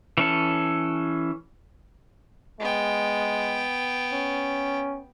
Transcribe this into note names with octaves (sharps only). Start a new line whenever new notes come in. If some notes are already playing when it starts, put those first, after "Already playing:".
E3 C#4 A4
G#3 B3 G5
C#4